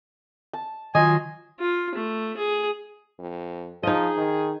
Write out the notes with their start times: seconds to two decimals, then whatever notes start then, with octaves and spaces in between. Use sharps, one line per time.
0.53 A5
0.95 D#3 F#3 F4 D#5 G#5
1.60 F4
1.95 A3
2.37 G#4
3.20 F2
3.83 F3 D#4 G#4 D#5
4.17 D#3